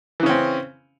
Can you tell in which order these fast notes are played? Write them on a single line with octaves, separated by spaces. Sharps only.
E3 C#3 C#4 C4